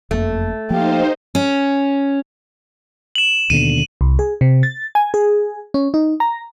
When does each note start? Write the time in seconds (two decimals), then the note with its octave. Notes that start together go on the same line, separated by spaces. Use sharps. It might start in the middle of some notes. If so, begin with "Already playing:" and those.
0.11 F#1 F2 A3 A#3
0.70 F3 A#3 D#4 G4 C5 F5
1.35 C#4
3.15 E7 F#7
3.50 D#2 B2 D3 D#7
4.01 C2
4.19 G#4
4.41 C3
4.63 A6
4.95 G#5
5.14 G#4
5.74 C#4
5.94 D#4
6.20 A#5